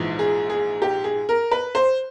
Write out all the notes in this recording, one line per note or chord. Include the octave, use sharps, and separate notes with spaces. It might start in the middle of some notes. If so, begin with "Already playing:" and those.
Already playing: A#1 G#2 E3
G#4
G#4
G4
G#4
A#4
B4
C5